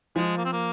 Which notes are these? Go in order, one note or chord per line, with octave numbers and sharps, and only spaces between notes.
F3 G#3
A#3
C4
A#3